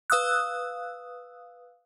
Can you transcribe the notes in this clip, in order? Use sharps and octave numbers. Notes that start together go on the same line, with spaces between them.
B4 F5 D#6 E6 F#6